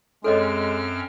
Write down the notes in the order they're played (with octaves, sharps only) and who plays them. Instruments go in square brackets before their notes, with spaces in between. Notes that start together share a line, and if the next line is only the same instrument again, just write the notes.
[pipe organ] F#2 C4 F6 [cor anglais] G#3 [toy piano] A4 C#5 D#5